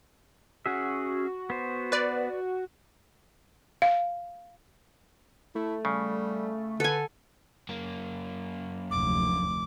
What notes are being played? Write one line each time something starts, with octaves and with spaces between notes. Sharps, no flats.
C#4 F#4 G#4 E5
B3 C5
B4 D5
F5
A3 E4
C#3 G3
D3 A4 B4 G#5
F#2 A#3
F1 D2 D6